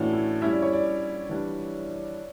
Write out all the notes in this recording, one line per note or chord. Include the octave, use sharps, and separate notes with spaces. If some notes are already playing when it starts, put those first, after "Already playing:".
Already playing: A2 E3 A3 C#4 D4 E4 F#4
E4
G3 C#4 E4 E5
D5
C#5
D5
E3 G3 D4